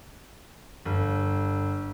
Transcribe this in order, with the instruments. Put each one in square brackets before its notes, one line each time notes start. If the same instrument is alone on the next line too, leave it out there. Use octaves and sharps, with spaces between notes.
[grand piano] G1